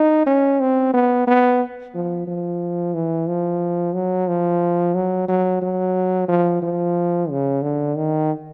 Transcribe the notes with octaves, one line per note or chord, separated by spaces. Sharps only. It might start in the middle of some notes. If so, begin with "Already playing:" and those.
Already playing: D#4
C#4
C4
B3
B3
F3
F3
E3
F3
F#3
F3
F#3
F#3
F#3
F3
F3
C#3
D3
D#3